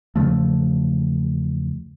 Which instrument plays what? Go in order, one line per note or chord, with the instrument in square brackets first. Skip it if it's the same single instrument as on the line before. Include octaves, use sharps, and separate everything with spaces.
[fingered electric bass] E2 C#3 F3 A3